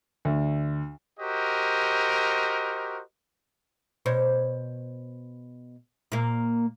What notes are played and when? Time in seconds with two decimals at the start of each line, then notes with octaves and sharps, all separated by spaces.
0.25 D2
1.20 F#4 G4 A#4 C5 D#5
4.06 B2 C5 C#5
6.12 A#2 A#3